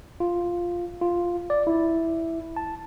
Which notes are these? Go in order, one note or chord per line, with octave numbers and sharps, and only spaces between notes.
F4
F4
D5
E4
A5